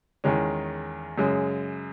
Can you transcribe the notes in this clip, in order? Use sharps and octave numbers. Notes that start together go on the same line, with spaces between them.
E2 D#3 G#3 C#4
F#2 C#3 G#3